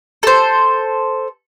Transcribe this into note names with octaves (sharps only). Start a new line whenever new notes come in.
A4 C5